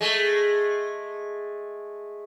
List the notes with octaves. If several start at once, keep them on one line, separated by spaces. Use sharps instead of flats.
G#3 A3